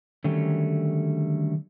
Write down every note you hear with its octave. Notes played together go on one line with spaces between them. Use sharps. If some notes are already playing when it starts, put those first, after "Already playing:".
D3 D#3 F#3 G3 A3 C#4